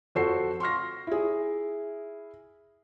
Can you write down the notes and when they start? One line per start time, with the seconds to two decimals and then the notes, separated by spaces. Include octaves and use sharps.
0.15 F2 F#4 A4 C5 F#5 C7
0.60 C6 C#6 F6 A#6
1.07 E4 G#4